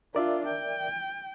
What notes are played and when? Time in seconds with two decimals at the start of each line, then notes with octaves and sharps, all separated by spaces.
0.15 D4 F4 A#4 D5 E5
0.48 G5